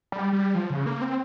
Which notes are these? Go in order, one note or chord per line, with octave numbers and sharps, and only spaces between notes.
G3
G3
F3
C#3
A#3
C4